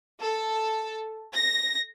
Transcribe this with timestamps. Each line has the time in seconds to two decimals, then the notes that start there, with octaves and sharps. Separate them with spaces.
0.21 A4
1.33 A#6